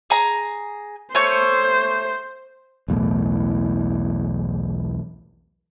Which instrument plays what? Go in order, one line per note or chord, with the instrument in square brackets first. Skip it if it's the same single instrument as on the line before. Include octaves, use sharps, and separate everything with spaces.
[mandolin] G#4 A#5
[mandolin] A3 C#5 C#6 [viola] C5
[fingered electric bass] B1 E2 A2